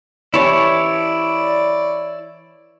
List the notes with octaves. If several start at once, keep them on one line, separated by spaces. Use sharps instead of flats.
E3 C#4 E4 G4 C#5 D5 A5